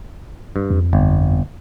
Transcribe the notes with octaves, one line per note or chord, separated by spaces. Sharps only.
G2
F2
G1